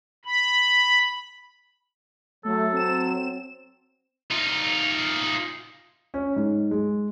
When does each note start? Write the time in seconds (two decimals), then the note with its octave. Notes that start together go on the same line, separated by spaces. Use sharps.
0.25 B5
2.45 F#3 A3 A4
2.73 C4 E7
4.31 D#4 F4
6.14 C#4
6.36 G#2
6.71 G#3